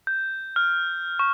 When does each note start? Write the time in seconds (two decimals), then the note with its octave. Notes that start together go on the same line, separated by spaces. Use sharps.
0.07 G6
0.56 F6
1.19 C#6